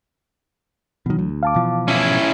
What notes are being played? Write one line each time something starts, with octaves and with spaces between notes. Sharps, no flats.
B2 D#3 E3 F#3
D2
F5 A5 D6
B2 E3 F3
C#4 E4
G#6